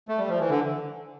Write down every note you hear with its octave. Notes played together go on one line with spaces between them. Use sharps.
A3
G3
F3
E3
D3